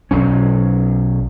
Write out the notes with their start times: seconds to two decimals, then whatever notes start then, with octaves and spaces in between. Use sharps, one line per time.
0.11 B1 F#3 C#4